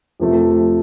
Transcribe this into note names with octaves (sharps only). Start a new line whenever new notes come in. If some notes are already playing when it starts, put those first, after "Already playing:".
F2 C3 F3 A3